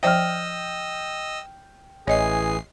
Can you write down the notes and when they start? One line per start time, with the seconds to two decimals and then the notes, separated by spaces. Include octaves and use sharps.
0.03 F3 C5 D#5 E5 G5 E6 F6
2.07 A1 E3 G#4 C#5 D#5 G#5 C7